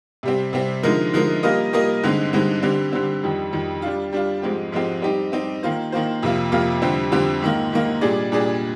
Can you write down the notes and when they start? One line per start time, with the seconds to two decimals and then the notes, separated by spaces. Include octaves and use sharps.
0.23 C3 G3 C4
0.53 C3 G3 C4
0.83 D3 F3 G#3 D#4 A#4
1.13 D3 F3 G#3 D#4 A#4
1.43 G3 A#3 F4 A#4 D#5
1.73 G3 A#3 F4 A#4 D#5
2.03 G2 D3 G#3 C4 D#4
2.33 G2 D3 G#3 C4 D#4
2.63 D3 G3 C4
2.93 D3 G3 C4
3.23 F2 D#3 G3
3.53 F2 D#3 G3
3.82 G3 D4 F4
4.12 G3 D4 F4
4.42 G#2 F3 G#3 C4 G4
4.72 G#2 F3 G#3 C4 G4
5.02 G3 C4 D#4 G4
5.32 G3 C4 D#4 G4
5.63 D#3 A#3 F4 C5
5.92 D#3 A#3 F4 C5
6.23 F2 C3 F3 A#3 F4
6.52 F2 C3 F3 A#3 F4
6.82 F2 D3 G3 C4 G4
7.12 F2 D3 G3 C4 G4
7.42 G#2 D#3 A#3
7.72 G#2 D#3 A#3
8.01 A#2 G3 D4 G#4 D5
8.32 A#2 G3 D4 G#4 D5